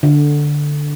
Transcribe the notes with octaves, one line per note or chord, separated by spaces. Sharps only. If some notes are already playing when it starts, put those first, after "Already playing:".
D3